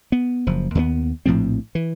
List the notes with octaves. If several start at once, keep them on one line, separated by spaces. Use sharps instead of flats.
B3
F#1 F3
D#2 A3 B3
A#1 A2 F3 C4
E3